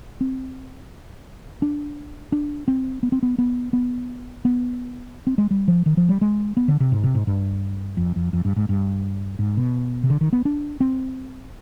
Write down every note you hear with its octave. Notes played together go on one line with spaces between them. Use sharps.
C4
D4
D4
C4
B3
C4
B3
B3
B3
B3
C4
G#3
G3
F3
D#3
F3
G3
G#3
B3
D3
C3
G#2
C3
G#2
G2
F2
F2
F2
G2
G#2
G2
G#2
B2
C3
D3
D#3
B3
D4
C4